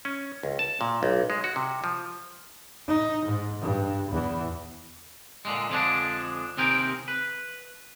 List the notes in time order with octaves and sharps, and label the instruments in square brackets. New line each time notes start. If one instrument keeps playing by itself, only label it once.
[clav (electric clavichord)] C#4
C#2
A5
A#2
B1
G#3
F#4
C3
F3
[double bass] D#4
G#2
G2
E2 E3
[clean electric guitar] A#2 D3 G#3
F2 D3 F3 G#3 B3 D4
D#2 C3 C4 G#4 A#4 G5
B4